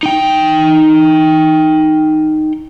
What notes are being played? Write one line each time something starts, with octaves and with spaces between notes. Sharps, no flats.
D#4 G5